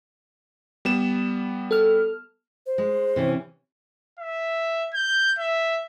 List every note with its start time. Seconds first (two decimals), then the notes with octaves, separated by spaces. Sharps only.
0.85 G3 B3 E7
1.71 A4 F6
2.66 C5
2.78 G#3
3.16 C3 E3 C#4
4.19 E5
4.94 G6
5.39 E5